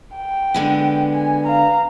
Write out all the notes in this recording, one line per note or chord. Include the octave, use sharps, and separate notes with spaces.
G5
D3 G#3 B3
G#5
F5 A#5